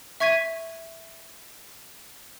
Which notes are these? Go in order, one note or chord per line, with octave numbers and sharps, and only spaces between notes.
E5 C#6 G#6 B6 D#7